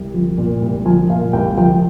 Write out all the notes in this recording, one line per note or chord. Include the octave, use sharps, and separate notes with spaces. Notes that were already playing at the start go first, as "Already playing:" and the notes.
Already playing: C2
F3
A#2
C2
F3 G#5
A#2 F5
C2 G5
F3 G5